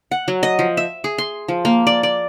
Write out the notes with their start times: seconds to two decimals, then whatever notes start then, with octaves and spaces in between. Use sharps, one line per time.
0.11 F#5
0.28 F#3
0.43 D#5
0.59 F3
0.77 E5
1.04 G#4
1.18 C6
1.48 F3
1.65 A#3
1.87 D5
2.03 D5